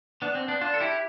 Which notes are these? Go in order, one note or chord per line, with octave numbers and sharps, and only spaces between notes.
B3 D4
C4
B3 D4
D4 F4
A4
E4 G4